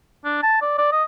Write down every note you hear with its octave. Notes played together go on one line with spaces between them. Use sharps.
D4
A5
D5
D5
D#5